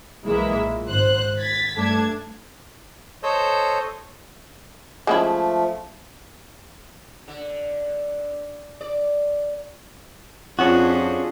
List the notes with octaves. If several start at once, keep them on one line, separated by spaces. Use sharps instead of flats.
B1 E3 G#3 A#3 E4 E5
A#2
G#1 C5 F#6
G#6 A6 B6
G2 A3 D4 A5 G#6
A4 C5 C#5 D#5 E6 G6
F3 G#3 A3 C#4 E4
D3
D5
F2 C#4 D4 F4 F#4 G#4